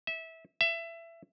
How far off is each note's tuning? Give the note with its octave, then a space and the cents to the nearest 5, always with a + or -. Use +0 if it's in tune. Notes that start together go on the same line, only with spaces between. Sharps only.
E5 -20
E5 +20